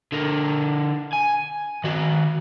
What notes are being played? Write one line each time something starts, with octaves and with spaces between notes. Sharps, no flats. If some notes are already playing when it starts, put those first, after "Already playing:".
D3 A#4
G#5
D#3 F#4